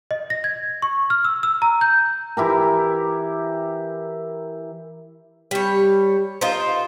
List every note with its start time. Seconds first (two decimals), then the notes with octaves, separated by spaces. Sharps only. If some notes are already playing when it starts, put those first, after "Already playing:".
0.11 D#5
0.30 A#6
0.44 G#6
0.82 C#6
1.10 F6
1.25 E6
1.43 E6
1.62 A#5
1.81 G6
2.37 E3 E4 G4 A#4
5.51 G3 C#5
6.41 D#4 F4 A#4 C5